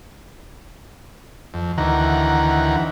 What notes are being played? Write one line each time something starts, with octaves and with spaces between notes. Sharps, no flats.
F2
D2 D#3 E3 F#5 A#5